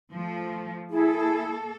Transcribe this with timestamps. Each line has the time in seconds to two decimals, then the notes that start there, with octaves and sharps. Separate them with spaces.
0.13 F3 A3
0.90 A#3 E4 G#4 A4